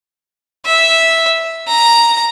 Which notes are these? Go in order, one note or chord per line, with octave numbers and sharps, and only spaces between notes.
E5
A#5